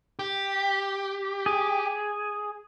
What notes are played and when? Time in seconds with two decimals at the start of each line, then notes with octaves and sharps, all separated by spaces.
0.19 G4
1.46 G#4